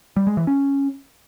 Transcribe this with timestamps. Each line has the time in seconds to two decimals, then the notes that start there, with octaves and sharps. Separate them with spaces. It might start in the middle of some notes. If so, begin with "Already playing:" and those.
0.16 G3
0.27 G#3
0.37 E3
0.47 C#4